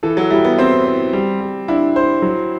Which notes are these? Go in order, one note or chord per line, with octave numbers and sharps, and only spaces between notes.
E3 A4
F#3
G3 E4
B3
C4 C5
C5
G3
G3
D4 E4
C5
F#3